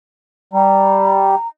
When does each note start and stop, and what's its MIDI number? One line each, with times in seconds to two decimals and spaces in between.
0.53 1.35 55
0.53 1.47 82